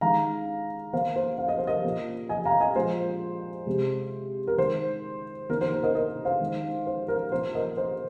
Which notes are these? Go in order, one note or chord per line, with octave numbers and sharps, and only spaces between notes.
D#3 G#3 F5 A#5
D#3 A#3 C5 F5
C5
F5
D#5
C5
A#4 D#5
A#2 A#3
D#5 G#5
F5 A#5
D#5 G#5
A#2 F3 G#3 C5
C3 G#3
A#4
D#3 G#3 C5
D#3 A#3 A#4
C5
C5
A#4 D#5
A#4 D#5
C5 F5
D#3 G#3
C5
A#4
A#2 A#3 C5
A#4 D#5
C5